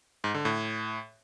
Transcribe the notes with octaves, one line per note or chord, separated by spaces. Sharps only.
G#2
D3
A2